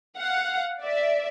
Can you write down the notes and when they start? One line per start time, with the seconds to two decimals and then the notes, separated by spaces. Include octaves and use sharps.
0.17 F5 F#5
0.83 D5 E5